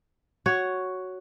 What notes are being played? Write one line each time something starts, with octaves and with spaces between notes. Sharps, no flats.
F#4 C#5